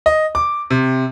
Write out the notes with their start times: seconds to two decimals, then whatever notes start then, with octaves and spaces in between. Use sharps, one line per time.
0.06 D#5
0.35 D6
0.71 C3